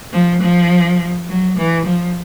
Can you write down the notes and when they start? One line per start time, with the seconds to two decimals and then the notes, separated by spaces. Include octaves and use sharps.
0.13 F3
0.42 F3
1.28 F#3
1.58 E3
1.86 F3